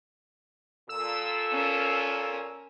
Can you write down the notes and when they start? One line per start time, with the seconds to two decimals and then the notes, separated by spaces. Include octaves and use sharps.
0.89 A#2 F4 A4 E6
1.52 C#4 A#4